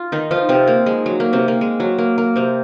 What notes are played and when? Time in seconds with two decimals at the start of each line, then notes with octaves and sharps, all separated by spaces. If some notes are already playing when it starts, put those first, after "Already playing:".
Already playing: F4
0.12 D#3 D#4
0.31 F3 F4
0.49 C3 C4
0.67 A#3
0.86 G#3
1.06 F#3
1.20 A#3
1.33 C3 C4
1.48 A#3
1.61 G#3
1.80 F#3
1.98 A#3
2.18 A#3
2.36 C3 C4